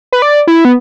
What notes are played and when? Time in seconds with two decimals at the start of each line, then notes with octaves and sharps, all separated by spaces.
0.13 B4
0.22 D5
0.47 E4
0.65 B3